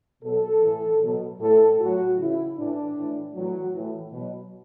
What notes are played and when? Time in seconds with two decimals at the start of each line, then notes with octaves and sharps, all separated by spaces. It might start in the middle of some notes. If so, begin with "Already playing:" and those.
0.23 B2 F#3 A4
0.62 A2 E3
1.02 B2 F#3
1.40 A2 E3 A4
1.79 A2 F#3 F#4
2.18 C#3 E3 E4
2.57 A2 E3 D4
2.96 A2 E3
3.35 A2 E3 F#3
3.74 A2 E3
4.13 B2 F#3